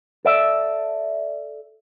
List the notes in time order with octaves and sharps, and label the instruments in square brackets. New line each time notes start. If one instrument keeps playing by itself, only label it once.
[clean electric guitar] A4 D5 E5